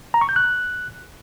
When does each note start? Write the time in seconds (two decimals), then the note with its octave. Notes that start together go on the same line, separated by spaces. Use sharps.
0.14 A#5
0.21 C#6
0.29 G6
0.36 F#6